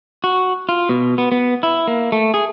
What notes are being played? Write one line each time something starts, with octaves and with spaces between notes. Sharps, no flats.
F#4
F4
B2
B3
B3
E4
A#3
A3
G#4